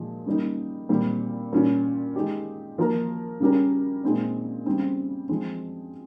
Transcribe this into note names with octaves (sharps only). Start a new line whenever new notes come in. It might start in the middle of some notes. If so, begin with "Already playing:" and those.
Already playing: A#2 F3 G#3
C#3 G3 A#3 D#4
A#2 G3 C4
A#2 G3 C#4 F4
G#3 D#4 G4
F3 A#3 F4 A#4
C#3 G3 C#4 G4 A#4
A#2 G#3 C4 D#4
C#3 G3 C4
F3 G#3 C4